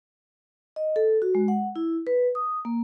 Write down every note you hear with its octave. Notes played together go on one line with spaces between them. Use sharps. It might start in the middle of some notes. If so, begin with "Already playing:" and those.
D#5
A4
F#4
G#3
F#5
E4
B4
D#6
A#3